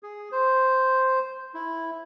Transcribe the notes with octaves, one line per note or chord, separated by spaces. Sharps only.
G#4
C5
E4